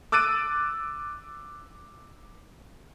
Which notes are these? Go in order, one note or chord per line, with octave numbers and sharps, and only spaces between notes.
D6 E6 F#6 A6 D7 D#7